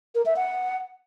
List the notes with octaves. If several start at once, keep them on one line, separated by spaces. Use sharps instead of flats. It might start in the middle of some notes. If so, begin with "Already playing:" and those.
A#4
E5
F#5